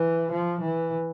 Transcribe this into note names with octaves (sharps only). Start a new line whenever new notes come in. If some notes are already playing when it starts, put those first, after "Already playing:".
Already playing: E3
F3
E3